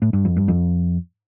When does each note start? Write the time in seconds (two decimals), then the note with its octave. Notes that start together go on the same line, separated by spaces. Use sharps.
0.02 A2
0.13 G2
0.25 F2
0.36 G2
0.48 F2